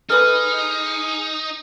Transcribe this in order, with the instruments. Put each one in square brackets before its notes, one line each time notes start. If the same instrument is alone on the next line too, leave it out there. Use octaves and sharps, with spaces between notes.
[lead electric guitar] D#4 [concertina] G#4 [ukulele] A4 B4 B5 [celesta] F6